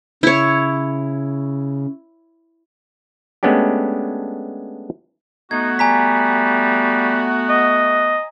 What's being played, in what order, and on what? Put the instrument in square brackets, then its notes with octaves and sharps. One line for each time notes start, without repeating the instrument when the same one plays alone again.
[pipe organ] C#3 [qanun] E4 C#5
[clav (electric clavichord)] G#3 A3 B3 C#4 D4 G4
[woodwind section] A3 B3 F#4 [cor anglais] D#4 [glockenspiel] G#6
[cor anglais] G3 [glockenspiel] G#5 A#5 B6
[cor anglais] D#5